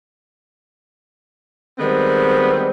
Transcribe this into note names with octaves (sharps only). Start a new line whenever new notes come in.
D#3 G3 G#3 B3 C4